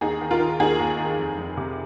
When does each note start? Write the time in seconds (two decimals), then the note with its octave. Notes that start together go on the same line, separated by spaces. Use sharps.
0.01 D#2 D#4 G#4
0.21 D#3
0.31 F4 A#4
0.40 D#3
0.59 D#2 D#4 G#4
0.80 D#2
0.99 D#3
1.18 F1
1.38 F1
1.57 C3